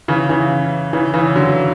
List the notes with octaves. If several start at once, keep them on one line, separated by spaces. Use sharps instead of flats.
C#3 E3
C#3 E3
C#3 E3
C#3 E3
D3 F#3